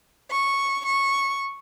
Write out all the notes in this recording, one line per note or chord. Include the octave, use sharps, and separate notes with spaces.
C#6
C#6